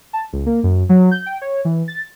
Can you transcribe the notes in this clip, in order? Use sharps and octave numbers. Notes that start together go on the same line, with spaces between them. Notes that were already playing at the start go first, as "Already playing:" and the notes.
A5
C#2
A#3
F#2
F#3
G6
G5
C#5
E3
A6